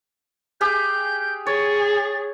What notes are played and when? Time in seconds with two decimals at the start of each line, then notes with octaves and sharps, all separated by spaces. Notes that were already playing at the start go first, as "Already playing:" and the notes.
0.61 G4 G#4 F5 G6
1.46 G#4 C#5 A6